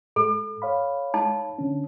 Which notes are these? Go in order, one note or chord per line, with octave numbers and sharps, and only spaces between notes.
G#2 A4
C#5 F5 B5
D#4 A5
D3 C#4